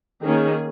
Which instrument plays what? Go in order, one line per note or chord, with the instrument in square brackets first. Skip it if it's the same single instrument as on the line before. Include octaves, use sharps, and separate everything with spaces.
[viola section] D#3 A#3 C#4 G#4